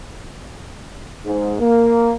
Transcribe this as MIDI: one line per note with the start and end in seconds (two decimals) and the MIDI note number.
1.25 1.53 44
1.58 2.15 58